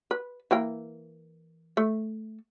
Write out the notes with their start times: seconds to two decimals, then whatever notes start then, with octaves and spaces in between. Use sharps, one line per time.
0.11 B4
0.51 E3 A#3 G5
1.77 A3